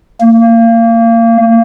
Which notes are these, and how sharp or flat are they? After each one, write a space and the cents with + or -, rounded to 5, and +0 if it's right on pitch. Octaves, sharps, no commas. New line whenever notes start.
A#3 -25